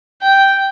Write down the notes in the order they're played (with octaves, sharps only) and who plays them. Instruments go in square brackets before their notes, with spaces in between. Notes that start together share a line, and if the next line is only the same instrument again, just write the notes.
[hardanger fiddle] G5